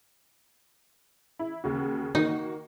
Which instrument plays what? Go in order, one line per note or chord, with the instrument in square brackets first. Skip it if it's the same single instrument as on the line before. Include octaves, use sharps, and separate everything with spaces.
[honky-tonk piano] E4
D#2 C#3 F#4
[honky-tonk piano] D#3 A#3 F#4 [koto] D#4